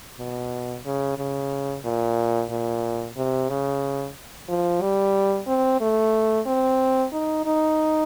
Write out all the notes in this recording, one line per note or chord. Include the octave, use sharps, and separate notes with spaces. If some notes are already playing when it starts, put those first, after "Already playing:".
B2
C#3
C#3
A#2
A#2
C3
C#3
F3
G3
C4
A3
C4
D#4
D#4